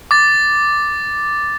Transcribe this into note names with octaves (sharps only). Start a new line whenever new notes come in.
D6 A6